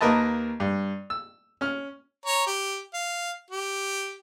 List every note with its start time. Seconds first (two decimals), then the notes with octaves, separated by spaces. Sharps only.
0.01 D#2 A#3 A#4 B4 D#5 A5
0.60 G2
1.10 E6
1.61 C#4 F6
2.26 C#5 A#5
2.47 G4
2.94 F5
3.50 G4